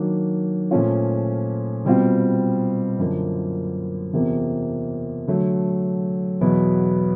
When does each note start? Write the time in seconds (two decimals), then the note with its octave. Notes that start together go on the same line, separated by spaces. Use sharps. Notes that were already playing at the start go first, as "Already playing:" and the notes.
Already playing: D#3 F#3 A#3 D4
0.71 A#2 F3 A3 C#4 F4
1.85 B2 G3 C4 F4
2.99 F#2 D3 F3 A#3
4.13 E2 C3 F3 A#3
5.27 D3 F#3 A3
6.41 E2 B2 F#3 B3 E4